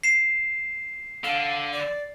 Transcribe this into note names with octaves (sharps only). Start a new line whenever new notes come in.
C7 E7
D3 F5
D5